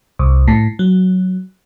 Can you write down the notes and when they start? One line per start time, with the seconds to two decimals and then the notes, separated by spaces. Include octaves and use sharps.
0.19 C2
0.48 A2
0.79 F#3